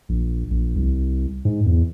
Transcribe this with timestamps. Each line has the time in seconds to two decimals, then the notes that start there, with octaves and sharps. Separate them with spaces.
0.09 A#1
0.51 A#1
0.76 C2
1.45 G#2
1.66 E2